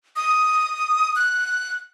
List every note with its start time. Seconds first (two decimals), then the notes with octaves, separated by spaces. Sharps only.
0.16 D#6
1.16 F#6